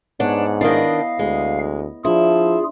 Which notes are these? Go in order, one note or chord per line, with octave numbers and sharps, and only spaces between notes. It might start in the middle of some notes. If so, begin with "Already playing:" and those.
G#2 B3 D4 C#5 F#5
D#3 D4 E4 D#5 F5
D2 G#3
F3 D4 E4 F4 G#4